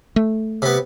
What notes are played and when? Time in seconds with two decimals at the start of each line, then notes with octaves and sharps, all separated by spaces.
0.16 A3
0.62 C3 B3